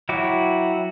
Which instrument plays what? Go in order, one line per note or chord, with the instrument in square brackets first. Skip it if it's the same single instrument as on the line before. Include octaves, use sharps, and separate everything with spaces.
[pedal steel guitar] F#3 E4 F#4 G5 D6